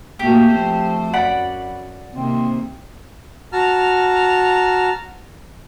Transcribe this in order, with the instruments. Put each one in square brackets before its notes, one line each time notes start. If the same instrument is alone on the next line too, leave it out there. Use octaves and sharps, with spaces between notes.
[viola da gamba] A#2 A#3 F#4 [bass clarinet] A3 [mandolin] G4
[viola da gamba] F3 C4 C5
[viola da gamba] F#2 [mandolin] D5 F#5 B5
[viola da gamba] C3 D#3 A#3 [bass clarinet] C4
[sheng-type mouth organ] F#4 A5 A#5 F6